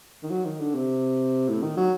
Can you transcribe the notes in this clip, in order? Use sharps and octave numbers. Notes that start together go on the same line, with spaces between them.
D#3
F#3
D#3
D3
C3
A2
D#3
F#3